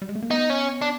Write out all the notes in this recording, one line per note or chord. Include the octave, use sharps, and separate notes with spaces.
G3
G#3
A3
A#3
B3 D#4
C#4
D4